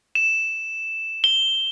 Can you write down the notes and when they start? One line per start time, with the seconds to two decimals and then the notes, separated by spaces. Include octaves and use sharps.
0.15 E7
1.24 G7